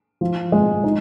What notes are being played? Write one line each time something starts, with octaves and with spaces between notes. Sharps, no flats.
F3
G#3
D#4